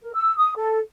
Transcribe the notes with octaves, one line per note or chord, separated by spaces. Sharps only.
A#4
E6
D#6
A4